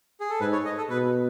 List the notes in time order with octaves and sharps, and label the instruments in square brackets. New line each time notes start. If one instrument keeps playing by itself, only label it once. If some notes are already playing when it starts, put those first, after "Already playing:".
[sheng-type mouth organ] G#4
A4
[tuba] G#2 [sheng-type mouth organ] B4
[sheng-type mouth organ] C#5
D#5
A4
[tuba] B2 [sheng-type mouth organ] B4